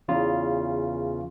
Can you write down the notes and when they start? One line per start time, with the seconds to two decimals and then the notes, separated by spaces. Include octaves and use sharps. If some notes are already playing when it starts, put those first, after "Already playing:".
0.08 E2 C#3 F4